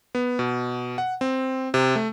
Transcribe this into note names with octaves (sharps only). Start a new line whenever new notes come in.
B3
B2
F#5
C4
C3
A3